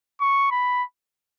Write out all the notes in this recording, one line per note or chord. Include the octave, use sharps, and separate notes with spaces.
C#6
B5